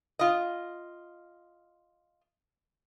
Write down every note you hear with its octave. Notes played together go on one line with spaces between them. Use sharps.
F4 D#5